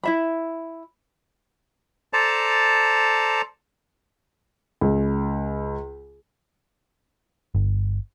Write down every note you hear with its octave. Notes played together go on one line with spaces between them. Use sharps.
E4 E5 B5
A4 C5 D5 A5 A#5
C#2
G1